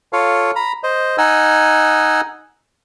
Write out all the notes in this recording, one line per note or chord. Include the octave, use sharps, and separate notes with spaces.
F4 A4 C#5 F5
A#5 B5
C5 D#5
D#4 D#5 F#5 G#5 E6